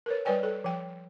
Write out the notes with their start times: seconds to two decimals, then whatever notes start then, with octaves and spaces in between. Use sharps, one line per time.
0.06 A#4 B4 C#5
0.25 G3 B4 C#5 D5 G5 G#5
0.43 A4
0.64 F3 G5